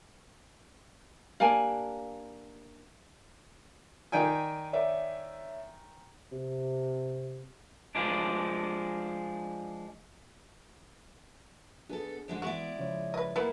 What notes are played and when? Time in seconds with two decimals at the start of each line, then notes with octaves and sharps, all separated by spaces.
1.40 G3 A#3 D4 F5 G#5 A5
4.12 D#3 D5 G5 G#5
4.73 C#5 D5 E5
6.32 C3
7.95 F3 G#3 D4
11.89 B3 D4 G#4 A4
12.28 F2 D3 G#3
12.42 E2 E3 G#3 B3 E4 F#4 D5
12.79 C#3 F3 C#5
13.14 B4 D#5
13.36 F#2 G3 A#3 B3 E4 B4